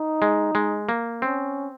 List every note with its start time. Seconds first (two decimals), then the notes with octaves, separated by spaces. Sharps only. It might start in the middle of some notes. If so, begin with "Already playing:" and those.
Already playing: D#4
0.22 G#3
0.55 G#3
0.89 A#3
1.22 C4 C#4